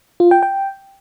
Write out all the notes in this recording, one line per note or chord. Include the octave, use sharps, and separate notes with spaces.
F4
G5
G5